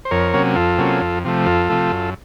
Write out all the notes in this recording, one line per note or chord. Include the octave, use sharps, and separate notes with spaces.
C5
F2 A#4 C#5
C3 F#3 A#3 C#4
F2 F4 A4
C3 F#3 A#3 C#4
F2
C3 F3 A3
F2 F4 A4
C3 F3 A3
F#2